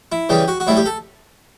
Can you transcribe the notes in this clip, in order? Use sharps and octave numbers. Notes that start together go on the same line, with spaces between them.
E4
C#3 E3 G3 G4
F#4
F#4
A2 G3 E4
G4
A4